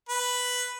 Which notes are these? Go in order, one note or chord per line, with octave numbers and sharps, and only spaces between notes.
B4